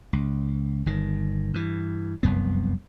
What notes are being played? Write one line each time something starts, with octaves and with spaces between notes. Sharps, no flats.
C#2
G1 D#3
G2 E3
F1 C2 F#2 B3